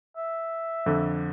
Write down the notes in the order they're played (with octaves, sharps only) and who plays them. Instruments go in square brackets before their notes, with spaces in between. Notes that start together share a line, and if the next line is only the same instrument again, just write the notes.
[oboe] E5
[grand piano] F2 D3